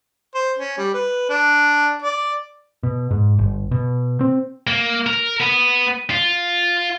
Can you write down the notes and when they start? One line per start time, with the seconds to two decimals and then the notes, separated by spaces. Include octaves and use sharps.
0.34 C5
0.58 C#4
0.78 G3
0.94 B4
1.29 D4
2.02 D5
2.83 B2
3.11 G#2
3.39 G1
3.71 B2
4.21 C4
4.67 A#3
5.07 A#4
5.40 B3
6.11 F4